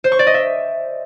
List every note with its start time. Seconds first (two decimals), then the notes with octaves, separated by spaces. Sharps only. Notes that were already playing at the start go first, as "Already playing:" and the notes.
0.04 C5
0.12 C#6
0.19 D5
0.27 D#5
0.34 E5